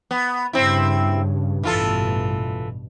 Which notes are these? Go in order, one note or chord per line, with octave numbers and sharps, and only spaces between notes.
B3
G2 C#3 C4 E4
A1 G2 B2 E3 F4 A4